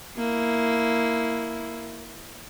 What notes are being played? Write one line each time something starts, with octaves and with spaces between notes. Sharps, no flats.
A#3 E4